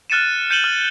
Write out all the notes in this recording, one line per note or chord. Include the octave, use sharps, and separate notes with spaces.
F6 F#6 A6 C#7 D#7 E7
G6 C#7 D#7 E7 F#7 G7
F6